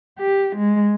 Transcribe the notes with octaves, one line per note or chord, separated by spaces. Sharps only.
G4
G#3